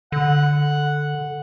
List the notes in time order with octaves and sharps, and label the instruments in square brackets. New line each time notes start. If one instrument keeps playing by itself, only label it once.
[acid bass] D3 [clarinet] F#5